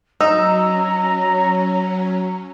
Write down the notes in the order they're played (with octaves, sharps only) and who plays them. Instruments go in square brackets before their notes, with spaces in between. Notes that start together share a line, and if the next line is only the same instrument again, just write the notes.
[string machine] F#3 C#4 [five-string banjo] D#4 [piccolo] A#5 [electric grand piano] E6